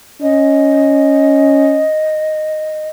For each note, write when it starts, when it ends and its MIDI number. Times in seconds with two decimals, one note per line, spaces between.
0.22 1.86 61
0.22 2.90 75